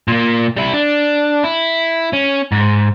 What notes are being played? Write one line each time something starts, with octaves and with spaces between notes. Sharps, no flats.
A#2 A#3
G3 E4
D4
E4
C#4
G#2